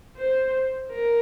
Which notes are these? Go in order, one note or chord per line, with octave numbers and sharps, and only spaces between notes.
C5
A#4